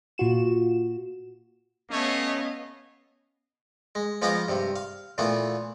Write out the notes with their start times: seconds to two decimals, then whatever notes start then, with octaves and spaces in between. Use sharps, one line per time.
0.18 A#2 F4 F#4 E7
1.91 A3 B3 C#4 C#5 D#5 F5
3.95 G#3
4.22 F3 G#3 B3 D#5 F5 D6
4.48 G2 C3
4.76 F5
5.18 A#2 E3 A3 B3